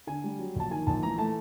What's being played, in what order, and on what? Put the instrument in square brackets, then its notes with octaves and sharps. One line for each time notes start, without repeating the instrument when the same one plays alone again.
[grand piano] D3 G#5
G3
F#3
A#1 A5
D#3 G#5
A#1 A5
E3 A#5
A3 A5